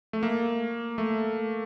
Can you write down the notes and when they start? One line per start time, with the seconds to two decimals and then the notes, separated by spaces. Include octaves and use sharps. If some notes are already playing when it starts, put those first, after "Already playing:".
0.13 A3
0.23 A#3
0.98 A3